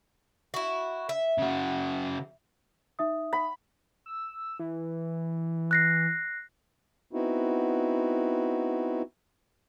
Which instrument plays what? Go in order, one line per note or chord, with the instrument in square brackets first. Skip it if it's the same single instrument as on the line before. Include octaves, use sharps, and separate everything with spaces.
[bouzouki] E4 F#4
E5
[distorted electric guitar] C#3 F#4
[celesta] D#4 E5 D#6
[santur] B5
[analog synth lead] E6
E3
[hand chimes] F#6 A#6 C7
[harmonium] B3 C4 D#4 E4 F#4